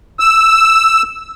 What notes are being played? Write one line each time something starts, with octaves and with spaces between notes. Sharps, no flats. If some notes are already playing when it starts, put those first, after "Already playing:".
E6